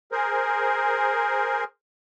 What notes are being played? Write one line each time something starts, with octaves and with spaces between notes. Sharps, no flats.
G#4 A#4 C5